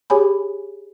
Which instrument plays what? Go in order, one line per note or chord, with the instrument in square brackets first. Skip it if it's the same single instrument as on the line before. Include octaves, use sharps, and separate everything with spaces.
[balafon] G4 G#4 C#5 G#5 B5